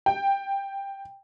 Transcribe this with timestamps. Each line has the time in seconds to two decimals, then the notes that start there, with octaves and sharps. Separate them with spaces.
0.06 G5